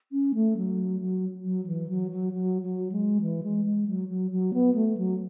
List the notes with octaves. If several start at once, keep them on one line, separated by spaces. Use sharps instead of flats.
C#4
A3
F#3
F#3
F#3
E3
F#3
F#3
F#3
F#3
G#3
E3
G#3
G#3
F#3
F#3
F#3
B3
A3
F#3